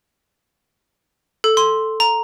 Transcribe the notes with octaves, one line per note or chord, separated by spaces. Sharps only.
A4
C6
A#5